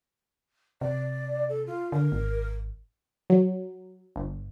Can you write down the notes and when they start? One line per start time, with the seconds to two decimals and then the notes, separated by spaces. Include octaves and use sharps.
0.81 C3 D5
1.49 A4
1.67 F4
1.92 D3 A#4
2.12 G#1
3.30 F#3
4.16 G1